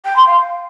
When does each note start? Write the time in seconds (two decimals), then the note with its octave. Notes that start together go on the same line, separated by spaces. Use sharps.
0.05 G5
0.16 C6
0.27 F5